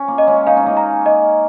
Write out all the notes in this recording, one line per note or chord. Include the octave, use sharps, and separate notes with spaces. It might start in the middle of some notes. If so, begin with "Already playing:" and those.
Already playing: C#4
A#3
D#5
G#3 C#4
D#4 F5
C#4
A#3 D#4
A#5
D#5